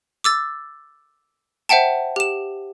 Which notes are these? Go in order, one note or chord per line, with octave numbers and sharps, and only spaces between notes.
D6 E6 A6
C5 E5 F#5 G5 A5
G4 E7